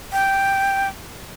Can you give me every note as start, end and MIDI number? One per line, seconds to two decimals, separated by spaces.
0.12 0.88 79